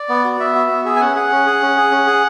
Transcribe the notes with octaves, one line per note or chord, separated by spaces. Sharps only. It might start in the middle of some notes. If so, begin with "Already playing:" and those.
Already playing: D5
B3
F#4
B3 E5
F#4
B3
G#4 E5
G#5
C#4 F#5
G#4 F#5
C#4
G#4
C#4
G#4
C#4
G#4